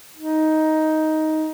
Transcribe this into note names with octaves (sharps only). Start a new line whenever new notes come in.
D#4